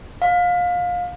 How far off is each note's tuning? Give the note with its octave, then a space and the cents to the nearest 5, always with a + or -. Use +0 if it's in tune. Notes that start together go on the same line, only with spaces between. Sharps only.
F5 +25